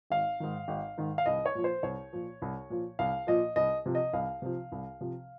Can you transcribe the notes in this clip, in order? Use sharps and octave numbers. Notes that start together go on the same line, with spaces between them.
G#1 F5
G#2 D#3
G#1
G#2 D#3
F5
C2 D#5
C#5
A#2 F3
C5
C2 C#5
A#2 F3
C2
A#2 F3
C2 F5
A#2 F3 D#5
C2 D#5
C3 F3
D#5
C2 F5
C3 F3
C2
C3 F3